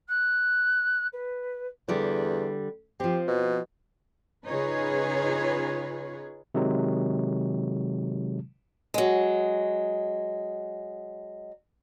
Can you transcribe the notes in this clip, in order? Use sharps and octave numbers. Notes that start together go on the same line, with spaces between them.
F#6
B4
E2 D3 G3
F3 C4 G4
B2
C#3 D#4 F4 G#4 B4 C#5
C3 D#3 F#3 G#3
F#3 G#3